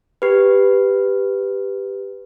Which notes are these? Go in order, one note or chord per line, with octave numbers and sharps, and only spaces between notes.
G4 B4